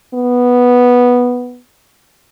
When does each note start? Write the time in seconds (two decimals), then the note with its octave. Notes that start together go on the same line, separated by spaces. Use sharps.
0.14 B3